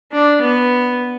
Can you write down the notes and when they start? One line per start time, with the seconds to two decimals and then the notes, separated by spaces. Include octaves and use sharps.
0.12 D4
0.41 B3